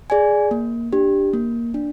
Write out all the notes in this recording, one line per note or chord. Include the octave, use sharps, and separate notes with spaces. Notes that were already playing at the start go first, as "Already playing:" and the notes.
G#4 D5 G#5
A#3
D4 G4
A#3
D4